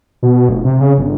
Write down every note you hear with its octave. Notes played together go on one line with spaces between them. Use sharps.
B2
F1
C3
C#3
G1